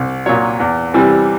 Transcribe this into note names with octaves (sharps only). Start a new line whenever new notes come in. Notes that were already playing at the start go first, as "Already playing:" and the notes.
Already playing: C2
A#2 F#3 C#5
E2
C3 E3 G3